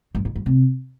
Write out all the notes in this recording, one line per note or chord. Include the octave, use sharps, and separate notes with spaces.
G2
G#2
G2
C3